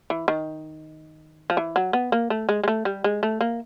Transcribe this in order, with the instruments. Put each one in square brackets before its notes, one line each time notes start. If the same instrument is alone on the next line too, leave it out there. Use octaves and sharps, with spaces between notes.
[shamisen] E3
D#3
F3
E3
F#3
B3
A#3
A3
G#3
G#3
A3
G3
G#3
A3
A#3